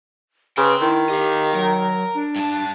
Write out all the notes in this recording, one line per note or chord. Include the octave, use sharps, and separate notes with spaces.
C#3 B4 G5 C6
D#3 E4
G4 D#5 F5
F#3 A#4
D4
G2 A5